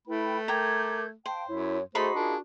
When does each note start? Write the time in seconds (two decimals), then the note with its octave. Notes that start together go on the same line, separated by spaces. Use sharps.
0.07 A3 E4 B4 G5 B5
0.48 A#4 G5 A#5 D6 G6 G#6
1.26 C5 F5 G5 A5
1.48 F#2 E4 C#5
1.95 A3 D#4 F#4 G#4 C5 B5 C6
2.15 D4 F4 G#4 A#4